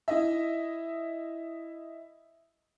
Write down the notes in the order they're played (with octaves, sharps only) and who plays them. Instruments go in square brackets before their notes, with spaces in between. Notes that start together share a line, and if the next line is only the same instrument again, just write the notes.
[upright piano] E4 D#5 E5